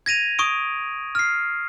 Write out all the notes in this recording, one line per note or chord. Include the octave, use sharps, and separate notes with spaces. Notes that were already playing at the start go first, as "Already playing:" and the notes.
G#6 A#6 D#7 F7
C#6 D#6 D7
F6 C7